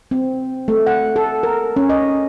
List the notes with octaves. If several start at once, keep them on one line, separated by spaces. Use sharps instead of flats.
C4
A3
F#5
A4
A#4
C#4
D#5